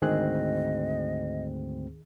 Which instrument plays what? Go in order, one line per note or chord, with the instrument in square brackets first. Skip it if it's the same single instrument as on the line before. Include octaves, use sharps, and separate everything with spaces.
[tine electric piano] D2 G#2 C4 [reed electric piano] D#3 G#4 F#6 [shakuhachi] D#5